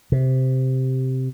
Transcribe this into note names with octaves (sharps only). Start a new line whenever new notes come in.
C3